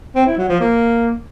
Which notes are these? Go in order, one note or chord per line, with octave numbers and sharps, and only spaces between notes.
C4
E4
F#3
F3
A#3